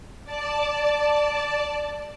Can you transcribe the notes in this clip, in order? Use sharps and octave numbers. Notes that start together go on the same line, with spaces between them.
D5 A5